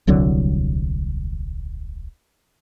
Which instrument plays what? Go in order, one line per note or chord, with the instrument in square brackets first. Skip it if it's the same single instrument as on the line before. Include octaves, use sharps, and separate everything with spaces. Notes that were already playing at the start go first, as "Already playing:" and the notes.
[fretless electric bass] D#1 C2 D3 F#3